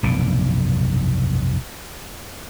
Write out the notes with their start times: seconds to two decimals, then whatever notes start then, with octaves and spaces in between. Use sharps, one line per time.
0.03 F1 B1 G2 A#2